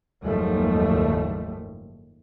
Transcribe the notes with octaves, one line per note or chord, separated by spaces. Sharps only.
F#1 D#2 G#2 F3 G3 A3